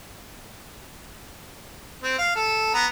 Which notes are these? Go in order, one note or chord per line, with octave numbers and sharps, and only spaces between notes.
C4
F5
A4
B3 A#5